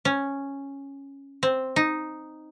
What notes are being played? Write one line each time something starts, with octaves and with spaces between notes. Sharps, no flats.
C#4
C4
D#4